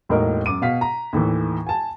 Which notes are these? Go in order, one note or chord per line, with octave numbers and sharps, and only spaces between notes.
E1 A2 A#3 D#4 A#4
F#2 D6 D#7
B2 F5 B6
A#5
D#2 A2 E3
G#5 A5